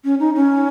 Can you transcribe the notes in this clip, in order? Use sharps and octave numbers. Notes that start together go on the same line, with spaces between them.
C#4
D#4
C#4